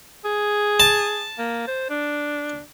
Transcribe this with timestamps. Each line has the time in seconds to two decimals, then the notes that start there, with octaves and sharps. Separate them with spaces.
0.25 G#4
0.80 A5
1.38 A#3
1.67 C5
1.90 D4